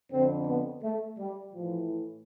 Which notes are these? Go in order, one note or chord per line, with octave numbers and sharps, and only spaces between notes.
F2 D3 C4
B3
A3
G3
A2 E3 F3